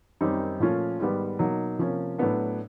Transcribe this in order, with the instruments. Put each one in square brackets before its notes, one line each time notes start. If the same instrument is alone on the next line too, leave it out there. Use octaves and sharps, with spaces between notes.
[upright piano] F#2 D#3 G3 C4 D#4
A#2 F3 A3 C#4 F4
G#2 D#3 G3 B3
B2 F#3 A#3 D#4
C3 F3 A#3 C#4
A2 F#3 B3 D4